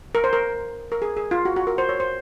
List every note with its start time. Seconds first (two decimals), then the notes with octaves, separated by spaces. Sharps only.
0.15 A#4
0.24 C5
0.33 A#4
0.92 A#4
1.02 G#4
1.17 G#4
1.31 F4
1.45 F#4
1.56 F#4
1.67 A#4
1.78 C5
1.89 C#5
2.00 C5